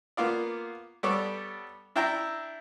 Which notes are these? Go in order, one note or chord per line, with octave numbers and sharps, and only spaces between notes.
A#3 B3 F4 D5
G3 B3 A4 C#5 D5
D4 E4 E5 G5 A#5